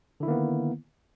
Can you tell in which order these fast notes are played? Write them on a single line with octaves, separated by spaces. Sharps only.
D3 E4 D#3 A#3 B3